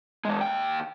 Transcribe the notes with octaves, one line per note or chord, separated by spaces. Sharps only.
E3 G#3
D#2 G5